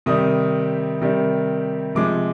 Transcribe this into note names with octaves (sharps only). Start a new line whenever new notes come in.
C3 D#3 G3 D#6
C3 D#3 G3
C3 F3 G#3 D6